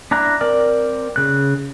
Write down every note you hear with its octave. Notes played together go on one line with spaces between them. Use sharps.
D4 E4 A#5 F#6
C4 A#4 D5 D6 F6
C#3 F#6